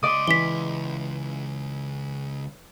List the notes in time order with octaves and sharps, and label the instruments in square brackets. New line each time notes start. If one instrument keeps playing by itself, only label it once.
[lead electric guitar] C#2 C6 [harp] D5 D#5 D#6
[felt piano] E3 [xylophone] B6 G7